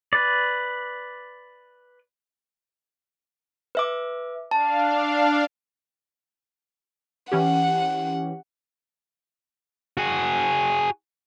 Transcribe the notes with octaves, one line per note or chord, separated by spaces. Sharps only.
B4 D5
B4 E5 D6
D4 F5 A5
E3 C#4 G4 F#5
F#4 G#4